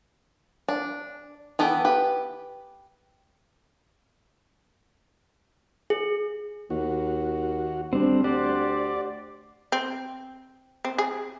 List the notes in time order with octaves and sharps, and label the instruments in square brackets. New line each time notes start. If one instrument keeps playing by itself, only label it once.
[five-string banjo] D4
E3 B3 A4 G5
G4 B4
[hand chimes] G#4
[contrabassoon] D#2 [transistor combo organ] F#4
[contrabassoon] D2 [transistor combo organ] G3 [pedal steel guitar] C4 D4
[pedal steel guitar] G4 C5 F#5 [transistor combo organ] D5
[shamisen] C4
C4
G#4